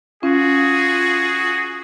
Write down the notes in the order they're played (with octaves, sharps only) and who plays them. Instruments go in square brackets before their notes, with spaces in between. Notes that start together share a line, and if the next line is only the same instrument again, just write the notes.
[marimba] C#4 [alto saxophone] F4 [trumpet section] F#4 G#4